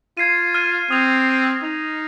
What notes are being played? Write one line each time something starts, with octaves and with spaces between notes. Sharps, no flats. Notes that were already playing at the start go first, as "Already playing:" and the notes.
F4 G#6 C7 D#7
F6 G#6 D#7
C4 D#6 G#6 F7
G#6 D#7
D#4 F6 G#6 F7